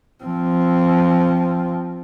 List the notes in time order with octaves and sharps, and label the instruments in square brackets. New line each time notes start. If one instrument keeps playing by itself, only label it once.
[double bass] F3 C4